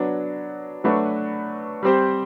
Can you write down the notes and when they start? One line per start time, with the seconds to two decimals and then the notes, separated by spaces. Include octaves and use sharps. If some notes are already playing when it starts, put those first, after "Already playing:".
Already playing: F#3 B3 D4
0.84 F#3 A3 D4 F#4 B4
1.83 G3 C4 G4 C5